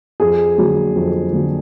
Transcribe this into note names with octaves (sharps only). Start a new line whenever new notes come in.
F2 G#4
D3 F#3 A#3
F2
D3 F#3 A#3